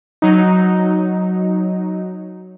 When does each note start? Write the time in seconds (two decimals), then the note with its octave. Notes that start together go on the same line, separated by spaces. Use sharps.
0.22 F#3 D#4